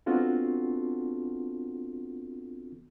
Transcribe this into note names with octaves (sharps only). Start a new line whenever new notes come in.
B3 C4 D4 F4 F#4 A4